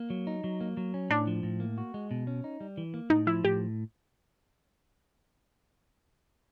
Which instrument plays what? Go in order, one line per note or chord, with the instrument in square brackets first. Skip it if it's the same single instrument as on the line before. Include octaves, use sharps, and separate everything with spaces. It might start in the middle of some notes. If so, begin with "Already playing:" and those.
Already playing: [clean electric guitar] A#3
F#3
D#4
F#3
A#3
F#3
C#4
[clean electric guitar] A2 [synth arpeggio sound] D4
[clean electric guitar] F3
A2
A#3
F#4
G#3
B2
C#4
D#4
G3
E3
A#3
[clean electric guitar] A2 [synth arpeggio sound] D#4
[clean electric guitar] F3 [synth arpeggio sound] E4
[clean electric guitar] A2 [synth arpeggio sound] G4